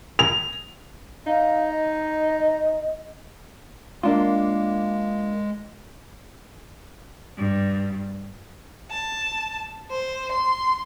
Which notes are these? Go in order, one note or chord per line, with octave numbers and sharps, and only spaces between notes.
F7
D#4 F5
D#5
G#3 A#3 D4 F4
G2
A5
C5
C6